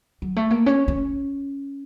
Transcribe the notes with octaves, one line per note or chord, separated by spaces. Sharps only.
F#3
A3
A#3
C#4
C#4